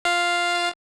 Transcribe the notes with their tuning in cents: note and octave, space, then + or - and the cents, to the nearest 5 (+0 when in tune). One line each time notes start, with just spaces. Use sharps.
F4 +0 F5 +0